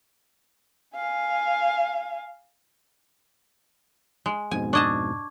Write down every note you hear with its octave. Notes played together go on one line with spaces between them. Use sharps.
F5 G#5
G#3
F2 G#2 B2 G#5
D4 D#5 A5 C#6 D6 G#6